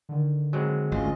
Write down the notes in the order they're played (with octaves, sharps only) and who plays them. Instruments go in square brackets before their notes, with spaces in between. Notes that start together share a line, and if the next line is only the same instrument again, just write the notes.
[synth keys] D3 D#3
[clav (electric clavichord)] F#3 G#3 C4
[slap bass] G#1 D2 C#3 [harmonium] C#4 F4 D#5